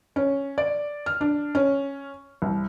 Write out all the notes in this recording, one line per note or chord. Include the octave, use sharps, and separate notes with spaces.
C#4
D5
F6
D4
C#4
C2